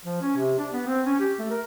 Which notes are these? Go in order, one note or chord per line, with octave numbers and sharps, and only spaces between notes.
F3
C#4
C3
D4
B3
C4
C#4
G4
A3
A#4